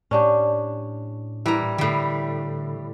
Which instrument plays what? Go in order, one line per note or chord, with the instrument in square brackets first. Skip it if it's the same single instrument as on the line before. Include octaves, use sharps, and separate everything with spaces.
[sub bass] A2 [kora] C#4 D4 G4
[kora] E3 A#4 [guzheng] G3 A#5
[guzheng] A2 G3 [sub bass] D3